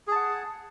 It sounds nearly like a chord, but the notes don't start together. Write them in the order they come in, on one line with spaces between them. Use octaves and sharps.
G#4 A5 F#5